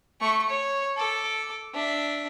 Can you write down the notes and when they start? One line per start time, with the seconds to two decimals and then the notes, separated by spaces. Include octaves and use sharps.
0.21 A3 C#6
0.50 C#5
0.97 A4 D6
1.74 D4 E5